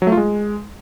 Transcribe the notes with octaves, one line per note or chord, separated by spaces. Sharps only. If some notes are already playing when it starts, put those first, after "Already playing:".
F#3
A3
F4
G#3